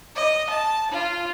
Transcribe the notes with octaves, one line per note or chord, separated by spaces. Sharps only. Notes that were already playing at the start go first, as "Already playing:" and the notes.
D#5
A5
F4